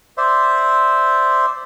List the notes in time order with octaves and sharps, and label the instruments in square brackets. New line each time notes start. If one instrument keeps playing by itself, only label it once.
[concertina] C5 D5 E5